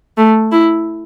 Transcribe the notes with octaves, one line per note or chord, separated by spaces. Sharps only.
A3
E4